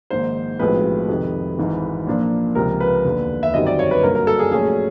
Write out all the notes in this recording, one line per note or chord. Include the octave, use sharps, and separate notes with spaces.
A#1 G#2 D#3 C5
B1 A2 F3 G#3 C4 B4
F2 C3 D#3
G#1 G#2 E3
A#2 F3 A#3 D4 F4
C#2 C3 F3 A#4
B4
E1 D#2 D3
E5
G1 F#2 D#3 G3 C4 D#5
D5
C#5
B4
G2 D3 F#3 A#3 A#4
A#4
A4
G#4
A#1 A#2 F#3 A3 C#4 G#4